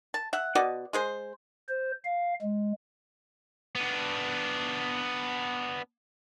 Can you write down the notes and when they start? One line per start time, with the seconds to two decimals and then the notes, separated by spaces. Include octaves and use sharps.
0.14 A5
0.33 E5 F#5
0.55 B2 F#4 D5 D#5
0.93 G#3 G#4 C5
1.69 C5
2.05 F5
2.42 G#3
3.75 B3 D4